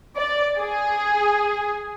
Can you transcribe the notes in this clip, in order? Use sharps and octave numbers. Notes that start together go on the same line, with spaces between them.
D5
G#4